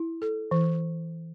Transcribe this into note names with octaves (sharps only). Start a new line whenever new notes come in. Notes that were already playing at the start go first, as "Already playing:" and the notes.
Already playing: E4
A4
E3